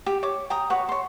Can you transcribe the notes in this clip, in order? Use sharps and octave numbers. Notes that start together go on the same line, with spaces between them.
G4
C#5 D6
G5 A#5 D#6
F#4 B4 C#5
C#5 C6